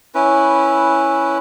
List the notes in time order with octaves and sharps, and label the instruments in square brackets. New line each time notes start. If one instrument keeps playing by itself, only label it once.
[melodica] C#4 E4 B4